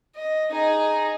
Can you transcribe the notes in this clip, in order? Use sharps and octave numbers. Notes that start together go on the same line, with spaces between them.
D#5
D#4 G#4